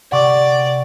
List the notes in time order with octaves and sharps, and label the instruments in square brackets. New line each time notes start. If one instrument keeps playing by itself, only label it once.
[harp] C3 [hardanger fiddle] D5 [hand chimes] F#5 C#6 D6